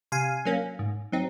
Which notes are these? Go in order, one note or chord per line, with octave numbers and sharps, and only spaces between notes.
C3 F5 G#5
F#3 A#3 C#4
G#2
F#3 C4 D#4